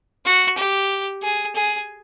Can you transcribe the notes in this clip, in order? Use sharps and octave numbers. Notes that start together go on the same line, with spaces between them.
F#4
G4
G#4
G#4